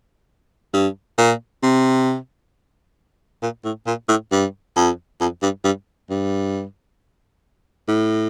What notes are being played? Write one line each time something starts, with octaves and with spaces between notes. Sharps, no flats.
G2
A#2
C3
A#2
A2
A#2
A2
G2
F2
F2
G2
G2
G2
A2